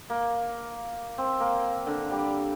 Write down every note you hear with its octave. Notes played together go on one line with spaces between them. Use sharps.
A#3
C4
A#3
D3
G3